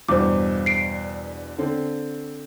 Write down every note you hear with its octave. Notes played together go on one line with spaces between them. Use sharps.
E2 G2 B2 C5 D6
C7 D7
D3 C4